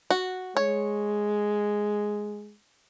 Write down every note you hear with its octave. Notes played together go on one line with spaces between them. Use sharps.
F#4
G#3 C#5